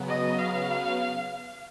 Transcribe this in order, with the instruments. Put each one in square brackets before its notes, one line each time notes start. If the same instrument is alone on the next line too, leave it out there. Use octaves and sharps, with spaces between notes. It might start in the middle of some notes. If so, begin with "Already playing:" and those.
Already playing: [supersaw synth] C#3 F#3 B3
[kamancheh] D#5
F5